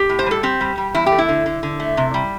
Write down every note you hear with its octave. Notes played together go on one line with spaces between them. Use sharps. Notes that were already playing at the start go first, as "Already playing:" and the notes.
Already playing: G4
A2
C5
G3 A4
C4 G4
G3
G3
E2 E4
G4
A3
E4
D3
D3
D3
A3
C3
G3